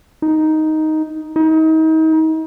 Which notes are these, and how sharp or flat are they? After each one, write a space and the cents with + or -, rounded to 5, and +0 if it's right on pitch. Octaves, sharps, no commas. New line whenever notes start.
D#4 +5
D#4 +35